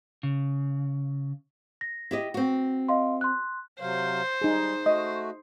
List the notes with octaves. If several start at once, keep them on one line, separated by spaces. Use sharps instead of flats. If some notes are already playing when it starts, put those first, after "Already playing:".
C#3
A#6
E4 G4 D#5
C4 F#4
D#5 F5 C6
C6 F#6
C3 F#3 C5 F5
G3 D#4 G#4
A3 F#4 D#5 D#6